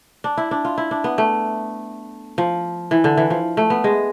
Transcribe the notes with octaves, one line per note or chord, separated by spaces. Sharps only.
D4
E4
D4
F4
E4
D4
B3
A3
F3
E3
D3
E3
F3
A3
B3
G#3